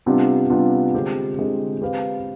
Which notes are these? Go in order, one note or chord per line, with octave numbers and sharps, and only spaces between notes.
C3 G3 B3 D4 F4
C3 G3 B3 D4 F4
D3 G#3 C4 G4
D3 G#3 C4 G4
C4 G4 B4 F5